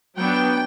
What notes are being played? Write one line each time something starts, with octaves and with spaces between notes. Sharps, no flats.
F#3 B3 D4 G5